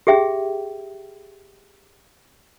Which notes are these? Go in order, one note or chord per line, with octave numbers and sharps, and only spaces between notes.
G4 G#4 E5 G5